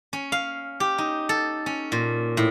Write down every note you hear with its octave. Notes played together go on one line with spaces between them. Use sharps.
C#4
F5
G4
D#4
A4
C#4
A#2
A2